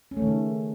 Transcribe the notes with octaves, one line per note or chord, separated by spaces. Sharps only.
C#4
A3
D#3
C#3